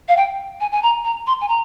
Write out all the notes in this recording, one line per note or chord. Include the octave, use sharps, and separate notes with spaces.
F5
G5
G#5
G#5
A#5
A#5
C6
G#5
A#5